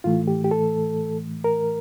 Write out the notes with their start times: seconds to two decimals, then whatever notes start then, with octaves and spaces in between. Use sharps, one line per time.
0.04 A2 E3 A3 F4
0.28 G4
0.44 G4
0.51 A4
1.44 A#4